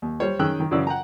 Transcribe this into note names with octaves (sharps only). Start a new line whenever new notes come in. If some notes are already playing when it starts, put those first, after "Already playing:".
D#2
G3 C5 C#5
D#3 C#4 G#4 G5 E6 F#6
D#3
F#2 C#3 E3 C#4 D5 E6
F#5 G5 A#5